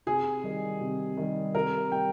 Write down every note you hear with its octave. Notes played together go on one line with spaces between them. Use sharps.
C3 G#4
D#3 G3
C3
D#3 G3
C3 A#4
G3 G5